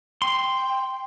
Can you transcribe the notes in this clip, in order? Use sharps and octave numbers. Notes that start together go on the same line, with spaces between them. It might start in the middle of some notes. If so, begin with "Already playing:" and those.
G5 C6